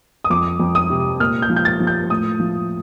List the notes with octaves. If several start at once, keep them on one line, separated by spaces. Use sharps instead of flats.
D#6
F2 D6
F2
D#6
C3
A#2 F6
G6
F3
G6
A6
F3
G6
A2 D#6
F3